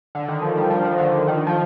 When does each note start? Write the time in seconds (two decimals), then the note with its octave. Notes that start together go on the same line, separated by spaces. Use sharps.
0.15 D3
0.28 D#3
0.42 F3
0.57 G3
0.70 F3
0.85 D#3
0.98 D3
1.27 D#3
1.47 F3